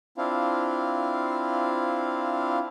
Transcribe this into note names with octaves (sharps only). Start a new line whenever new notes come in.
C4 D4 E4 F4 F5